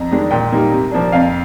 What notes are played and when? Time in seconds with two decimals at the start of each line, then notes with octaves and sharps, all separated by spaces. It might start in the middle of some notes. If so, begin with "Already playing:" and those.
Already playing: F2 A#5
0.11 D#3 G#3 D4
0.31 A#2 G5
0.52 G3 A#3 D#4
0.72 C3
0.91 F3 A#3 D4
1.12 F2 F5